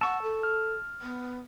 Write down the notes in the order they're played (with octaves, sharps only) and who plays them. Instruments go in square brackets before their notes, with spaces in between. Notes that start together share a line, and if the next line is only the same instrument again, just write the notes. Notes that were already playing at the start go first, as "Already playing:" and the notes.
[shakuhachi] F#5 [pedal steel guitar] A5 C#6 [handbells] E6
[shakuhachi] A4
[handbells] F6
[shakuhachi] B3